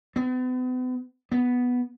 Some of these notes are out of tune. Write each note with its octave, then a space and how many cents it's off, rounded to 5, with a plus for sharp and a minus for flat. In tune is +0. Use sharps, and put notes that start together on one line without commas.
B3 +40
B3 -5